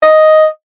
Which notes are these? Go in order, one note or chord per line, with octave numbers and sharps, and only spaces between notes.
D#5